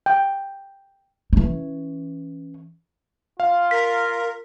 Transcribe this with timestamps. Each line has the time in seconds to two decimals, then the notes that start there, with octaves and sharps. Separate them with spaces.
0.06 G5
1.33 E3 C#4
3.40 F4 F5
3.71 A#4 B6